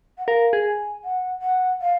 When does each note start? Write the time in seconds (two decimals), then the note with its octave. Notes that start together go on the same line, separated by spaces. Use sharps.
0.18 F#5
0.27 A#4 F5
0.53 G#4
0.65 G#5
1.04 F#5
1.42 F#5
1.82 F5